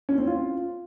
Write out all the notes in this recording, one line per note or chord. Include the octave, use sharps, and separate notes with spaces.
C#4
C4
F4